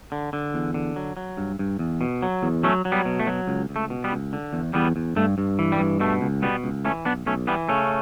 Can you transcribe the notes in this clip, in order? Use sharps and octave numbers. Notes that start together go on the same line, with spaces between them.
D3
D3
E2
D3
F#3
F#3
G2
G2
E2
B2
F#3
E2
F#3 A3 C#4
F#3
G3 B3
B2
A3
F#3
C#2
C#2
A3
B2
G3 B3
C#2
D3
E2
E2 G3 B3
E2
G2 A3
G2
E3
G3
G2
B2 A3
C#2
B2 G3 B3
C#2
E3 A3 C#4
B1 B3 D4
B1 A3 C#4
E3 G3 B3
C#3 A3 C#4